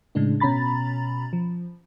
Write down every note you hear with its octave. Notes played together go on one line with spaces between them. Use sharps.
A2 C#3 G#3 D4
B2 C#4 A#5 B5 A6
F3